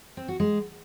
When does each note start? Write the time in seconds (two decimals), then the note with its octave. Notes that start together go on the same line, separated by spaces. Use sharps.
0.17 C4
0.28 F#4
0.40 G#3